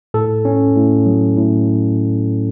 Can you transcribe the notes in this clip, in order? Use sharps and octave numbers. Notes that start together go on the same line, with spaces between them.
A2 A4
C#4
A2
F#3
A2